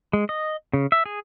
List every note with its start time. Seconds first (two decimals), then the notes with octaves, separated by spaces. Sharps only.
0.13 G#3
0.29 D#5
0.74 C#3
0.92 E5
1.06 G#4